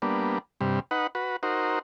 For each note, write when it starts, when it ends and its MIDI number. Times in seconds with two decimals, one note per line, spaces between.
0.02 0.38 55
0.02 0.38 58
0.02 0.38 59
0.02 0.38 62
0.61 0.80 43
0.61 0.80 48
0.61 0.80 55
0.91 1.07 63
0.91 1.07 71
0.91 1.07 78
1.15 1.36 66
1.15 1.36 71
1.43 1.79 63
1.43 1.79 66
1.43 1.79 70
1.43 1.79 72